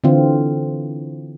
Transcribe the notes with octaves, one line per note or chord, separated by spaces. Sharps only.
D3 E3 C4 F4